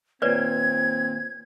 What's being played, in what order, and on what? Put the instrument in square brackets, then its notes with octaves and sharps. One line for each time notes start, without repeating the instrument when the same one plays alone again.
[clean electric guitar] D#2 A#2 [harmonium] C4 [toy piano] B4 C#5 D5 [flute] G#6